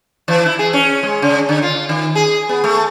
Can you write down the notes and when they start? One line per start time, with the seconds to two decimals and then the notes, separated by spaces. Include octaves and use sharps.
0.28 E3
0.46 E4
0.59 G#4
0.73 C#4
1.03 G#3
1.22 C#3
1.49 D3
1.62 F4
1.89 D#3
2.15 G#4
2.49 B3
2.64 A3